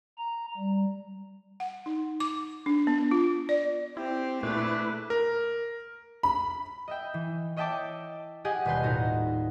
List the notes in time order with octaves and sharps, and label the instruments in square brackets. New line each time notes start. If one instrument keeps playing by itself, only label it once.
[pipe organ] A#5
G3
[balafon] F#5
D#4
D6
D4
B3
F4
D5
[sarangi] C4 [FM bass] E4 [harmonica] G4 C5
[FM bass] A#2 [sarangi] A3 [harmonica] D4 G#4 D6 [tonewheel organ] E4 B4
[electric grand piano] A#4
[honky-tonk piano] B5
[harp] D#5 E5 G5
E3
C#5 D#5 E5 G5 A5 D6
G4 G#4 D#5 F#5 G#5
D#1 B2 B4 C6 G6
A2 D#4 F#4